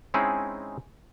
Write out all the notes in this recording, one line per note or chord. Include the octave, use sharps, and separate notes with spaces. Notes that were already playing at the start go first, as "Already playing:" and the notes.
G#3 C4 C#4 D#4 E4 G#4